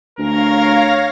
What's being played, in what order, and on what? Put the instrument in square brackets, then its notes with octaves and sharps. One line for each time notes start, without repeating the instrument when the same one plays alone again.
[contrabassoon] D2 [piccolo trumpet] A#4 [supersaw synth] C#5 F5 A#6